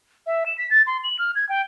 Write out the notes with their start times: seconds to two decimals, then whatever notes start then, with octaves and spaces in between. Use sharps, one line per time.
0.27 E5
0.46 E7
0.58 B6
0.70 A6
0.87 C6
1.04 F#7
1.19 F6
1.35 G#6
1.49 G5